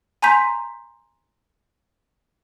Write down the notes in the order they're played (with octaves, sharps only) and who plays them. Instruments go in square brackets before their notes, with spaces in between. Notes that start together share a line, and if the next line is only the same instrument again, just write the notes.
[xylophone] G#5 A#5 C6 G6 B6